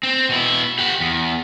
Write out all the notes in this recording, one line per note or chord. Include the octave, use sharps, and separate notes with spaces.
C4
B2 E4
G4 F#5
E2